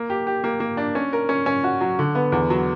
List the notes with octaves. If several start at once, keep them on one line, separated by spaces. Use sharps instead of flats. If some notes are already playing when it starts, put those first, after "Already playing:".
Already playing: A#3
G4
G4
A#3
A#3
D4
C#4
A#4
C#4
C#4
F#4
F#3
D3
B3
E2
F#3